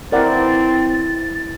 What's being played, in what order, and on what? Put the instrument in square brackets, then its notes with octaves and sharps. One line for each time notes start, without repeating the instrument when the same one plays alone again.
[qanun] E3 A3 E4 [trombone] C4 [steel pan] A#4 D5 F#5 [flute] A6